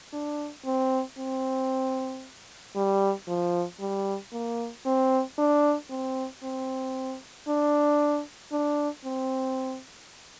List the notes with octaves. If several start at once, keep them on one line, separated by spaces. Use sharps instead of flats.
D4
C4
C4
G3
F3
G3
A#3
C4
D4
C4
C4
D4
D4
C4